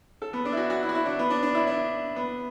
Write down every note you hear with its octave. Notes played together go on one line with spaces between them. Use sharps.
A4
B3
D4
E4
F#4
F#4
E4
F#4
E4
D4
B3
D4
D4
E4
D4
B3